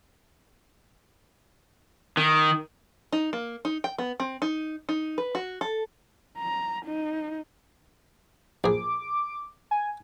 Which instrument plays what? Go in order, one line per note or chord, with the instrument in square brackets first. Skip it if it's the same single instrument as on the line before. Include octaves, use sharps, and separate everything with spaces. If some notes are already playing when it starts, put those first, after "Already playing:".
[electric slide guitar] D#3
[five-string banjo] D#4
A#3
D#4
G5
B3
C4
D#4
D#4
B4
F#4
A4
[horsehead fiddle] A#5
D#4
[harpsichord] A#1 G#4 [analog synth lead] D6
[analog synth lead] G#5